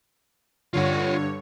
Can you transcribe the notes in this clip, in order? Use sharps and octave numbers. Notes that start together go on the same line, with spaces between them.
G2 D3 F4 C#5 F#5